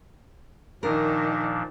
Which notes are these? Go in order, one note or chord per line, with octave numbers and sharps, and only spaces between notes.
A#2 D#3 F3 D4 A#4